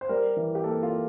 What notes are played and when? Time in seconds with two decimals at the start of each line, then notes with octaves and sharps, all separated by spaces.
0.01 C5
0.09 G3 A#4
0.37 E3
0.55 G4
0.64 A#3 A4
0.83 F4
0.91 A#3